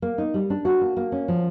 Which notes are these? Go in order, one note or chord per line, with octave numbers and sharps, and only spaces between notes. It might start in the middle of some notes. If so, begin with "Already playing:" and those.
A#3
D#4
G3
D4
F#4
A#3
A#3
C#4
F3